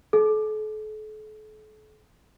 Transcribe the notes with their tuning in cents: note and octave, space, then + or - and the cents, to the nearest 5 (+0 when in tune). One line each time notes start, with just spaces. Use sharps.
A4 -40